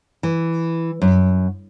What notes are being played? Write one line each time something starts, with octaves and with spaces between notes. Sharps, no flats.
E3
F#2